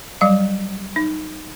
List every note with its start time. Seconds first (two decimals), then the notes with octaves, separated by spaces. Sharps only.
0.21 F#3 G3 F5
0.96 D#4